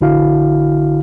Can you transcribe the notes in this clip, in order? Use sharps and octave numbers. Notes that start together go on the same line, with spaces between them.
A#1 D3 E4 F#4 F5